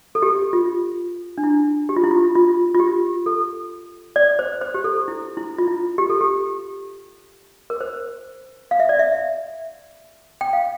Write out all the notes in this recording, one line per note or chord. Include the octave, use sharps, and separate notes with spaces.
A4
G4
F4
D4
E4
G4
F4
E4
F4
F4
F4
G4
A4
D5
C5
C5
G4
A4
E4
E4
F4
E4
G4
A4
G4
A#4
C5
F5
E5
D5
E5
G5
F5